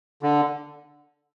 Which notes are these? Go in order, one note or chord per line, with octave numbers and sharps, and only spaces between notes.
D3